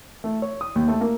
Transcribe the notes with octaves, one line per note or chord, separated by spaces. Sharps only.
A3
C#5
D#6
D#2
A3
A#3